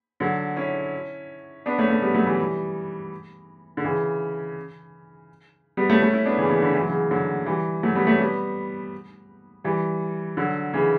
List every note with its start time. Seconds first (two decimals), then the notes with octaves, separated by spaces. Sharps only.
0.20 D3 F#3
0.56 C#4 E4
1.66 B3 D4
1.78 A3 C#4
1.90 A3 C#4
2.02 G3 B3
2.14 F#3 A3
2.26 E3 G3
3.77 D3
3.84 C#3 E3
5.77 G3 B3
5.89 A3 C#4
6.02 A3 C#4
6.13 C#4 E4
6.25 B3 D4
6.37 C#3 E3
6.49 C#3 E3
6.62 D3
6.74 E3
6.81 F#3
6.89 C#3 E3
7.11 D3 F#3
7.46 E3 G3
7.83 F#3 A3
7.95 G3 B3
8.07 A3 C#4
8.20 G3 B3
9.64 E3 G3
10.37 D3 F#3
10.73 C#3 E3